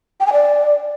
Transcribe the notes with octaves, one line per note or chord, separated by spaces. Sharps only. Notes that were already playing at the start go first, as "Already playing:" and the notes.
G5
G#5
D5